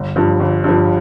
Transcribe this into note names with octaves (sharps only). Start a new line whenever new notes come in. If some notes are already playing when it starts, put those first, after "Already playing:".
Already playing: G1
G2 F3
G1
G2 F3